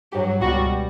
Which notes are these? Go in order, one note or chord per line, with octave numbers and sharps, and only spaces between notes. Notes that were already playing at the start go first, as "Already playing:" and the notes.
G2 F#3 G4
C#2 B2 G3 F#4